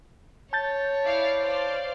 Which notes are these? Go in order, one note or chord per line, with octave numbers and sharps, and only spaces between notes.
C#5 A5 G6 A6
E4 D5 F5
C5 D5 F5